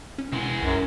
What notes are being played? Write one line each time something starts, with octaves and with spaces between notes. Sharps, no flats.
C#4
E2 C3 G#3 E4
C2 F#2